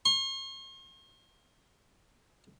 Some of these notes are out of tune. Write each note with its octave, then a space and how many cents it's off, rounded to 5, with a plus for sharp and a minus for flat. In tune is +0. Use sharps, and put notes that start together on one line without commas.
C6 +45